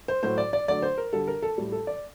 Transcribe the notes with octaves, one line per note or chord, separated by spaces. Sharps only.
C5
A2 F#3 A3 C5
D5
D5
D3 F#3 A3 D5
C5
A#4
D3 G3 A4
A#4
A4
A2 G3
A4
D5